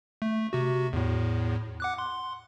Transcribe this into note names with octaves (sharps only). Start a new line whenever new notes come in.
A3
C3 F#4
E2 A2
F#5 D6 F#6
C6